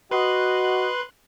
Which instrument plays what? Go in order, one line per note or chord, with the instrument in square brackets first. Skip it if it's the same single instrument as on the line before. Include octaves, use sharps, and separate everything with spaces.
[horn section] F#4 D#5 [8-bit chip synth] B4 C6 F#6